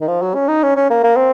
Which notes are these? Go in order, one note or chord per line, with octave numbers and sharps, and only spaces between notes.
D#3
F3
F#3
C#4
D#4
C#4
C#4
A#3
A#3
C4